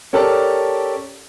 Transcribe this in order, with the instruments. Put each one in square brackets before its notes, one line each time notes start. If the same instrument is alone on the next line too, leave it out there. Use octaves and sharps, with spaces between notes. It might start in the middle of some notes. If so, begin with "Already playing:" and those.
[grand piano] C#4 G4 A4 A#4 D5 A5